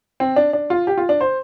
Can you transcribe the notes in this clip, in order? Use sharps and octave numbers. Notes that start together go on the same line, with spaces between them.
C4
D4
D4
F4
G4
F4
D4
C5